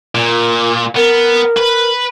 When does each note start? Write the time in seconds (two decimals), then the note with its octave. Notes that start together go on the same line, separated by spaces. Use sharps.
0.15 A#2
0.97 B3 A#4
1.57 B4